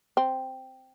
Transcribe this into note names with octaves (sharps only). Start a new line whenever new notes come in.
C4